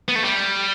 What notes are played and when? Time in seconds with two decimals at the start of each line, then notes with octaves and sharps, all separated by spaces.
0.08 B3
0.16 A3
0.24 G3